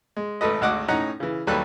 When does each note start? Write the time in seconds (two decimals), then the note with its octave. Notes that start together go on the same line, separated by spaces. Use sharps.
0.17 G#3
0.41 G#1 A3 A4 B4 D#5
0.61 G#1 D2 F#4 D#5 F#5 D6
0.88 A2 C#4 D#4 F#5 A#5
1.20 C#3 E3
1.47 D#2 F#3 G3 A4 B4 F#6